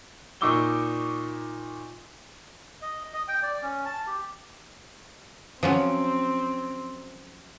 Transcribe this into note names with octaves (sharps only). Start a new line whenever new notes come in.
A#2 D#4 C#6 D6 E6 G7
D#5
D#5
G5
D5
C#4
A5
G4
F3 F#3 C4 C#4